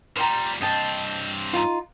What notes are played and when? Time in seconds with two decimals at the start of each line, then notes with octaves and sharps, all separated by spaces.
0.16 A#2 G3 C5 G5 A#5
0.61 G2 C4 D#5 G5 A5
1.53 D#4 F4